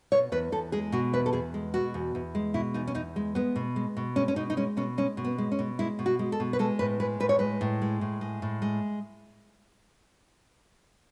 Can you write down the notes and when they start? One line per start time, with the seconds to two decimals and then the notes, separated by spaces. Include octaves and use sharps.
0.12 B2 C#5
0.32 E2 B4
0.52 E2 A4
0.72 G#3 G#4
0.92 B2 F#4
1.13 E2 B4
1.26 A4
1.33 E2 G#4
1.54 G#3
1.74 B2 F#4
1.94 E2
2.15 E2
2.35 G#3
2.54 B2 E4
2.74 E2 D#4
2.87 C#4
2.94 E2 D#4
3.16 G#3
3.35 G#3 B3
3.56 B2
3.76 G#3
3.97 B2
4.16 G#3 C#4
4.28 C#4
4.36 B2 D#4
4.50 D#4
4.57 G#3 C#4
4.77 B2 C#4
4.98 G#3 C#4
5.17 B2
5.25 B3
5.38 G#3
5.52 C#4
5.59 B2
5.79 G#3 E4
5.99 B2
6.06 F#4
6.19 G#3
6.32 A4
6.40 B2
6.53 B4
6.59 G#3 A4
6.79 A2 B4
7.00 G#3 B4
7.20 A2 B4
7.29 C#5
7.39 G#3 B4
7.61 A2
7.82 G#3
8.01 A2
8.21 G#3
8.42 A2
8.62 G#3